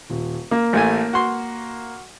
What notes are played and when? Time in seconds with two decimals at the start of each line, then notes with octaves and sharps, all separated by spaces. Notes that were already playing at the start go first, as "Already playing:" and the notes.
0.10 D#1
0.51 A#3
0.73 A1 A3 G#5
1.13 F#4 C6